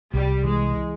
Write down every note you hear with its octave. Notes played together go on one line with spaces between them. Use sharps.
C2 G3
E3 G#3